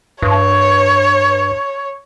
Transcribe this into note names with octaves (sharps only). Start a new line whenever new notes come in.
G2 C#5